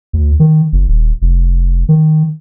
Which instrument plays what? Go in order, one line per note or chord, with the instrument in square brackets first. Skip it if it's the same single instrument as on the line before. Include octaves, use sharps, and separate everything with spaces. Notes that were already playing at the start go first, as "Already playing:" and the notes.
[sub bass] D2
D#3
F#1
D#1
F1
D#3